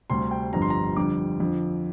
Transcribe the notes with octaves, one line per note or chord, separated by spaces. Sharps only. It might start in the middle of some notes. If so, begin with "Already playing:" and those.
D2 C3 G3 C6
G5
G1 F2 D3 G3 A#5
C6
A#5
F2 D3 G3 D6
F2 D3 F3